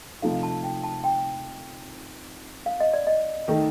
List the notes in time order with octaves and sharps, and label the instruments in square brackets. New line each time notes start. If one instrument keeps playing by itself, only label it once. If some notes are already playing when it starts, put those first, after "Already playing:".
[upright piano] C3 F3 A3 D#4 [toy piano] F5
[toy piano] A5
G5
A5
G5
F5
D#5
D5
D#5
[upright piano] D#3 A3 D#4